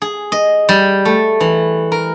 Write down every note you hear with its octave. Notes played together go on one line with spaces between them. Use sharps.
G#4
D#5
G3
A3
E3
A#4